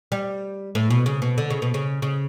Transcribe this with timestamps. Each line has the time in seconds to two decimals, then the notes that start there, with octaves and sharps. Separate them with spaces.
0.12 G3
0.75 A2
0.90 B2
1.06 C#3
1.22 B2
1.38 D3
1.50 C#3
1.62 B2
1.74 C#3
2.02 C#3